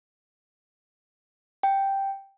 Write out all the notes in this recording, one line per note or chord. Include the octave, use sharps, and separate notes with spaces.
G5